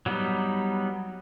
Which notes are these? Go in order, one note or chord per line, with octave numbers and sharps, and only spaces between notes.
F#3 G3 B3 D#4